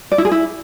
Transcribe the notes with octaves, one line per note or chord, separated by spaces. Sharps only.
D5
E4
G#4
E4